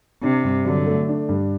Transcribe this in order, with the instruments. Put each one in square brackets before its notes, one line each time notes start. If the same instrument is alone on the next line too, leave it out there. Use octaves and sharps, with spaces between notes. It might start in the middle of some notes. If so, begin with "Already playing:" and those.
[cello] C3 [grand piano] D4
[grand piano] G2
[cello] D3 [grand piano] F#3
[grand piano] A3
D4
G2